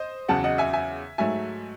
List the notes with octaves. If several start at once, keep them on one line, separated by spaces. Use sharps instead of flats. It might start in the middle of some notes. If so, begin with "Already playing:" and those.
Already playing: C5 D#5
E2 C#3 F#3 F#5 A5
D#5 F#5
E5 G#5
E5 G#5
G#2 F#3 A3 E5 G#5